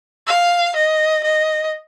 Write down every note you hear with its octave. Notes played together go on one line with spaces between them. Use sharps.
F5
D#5
D#5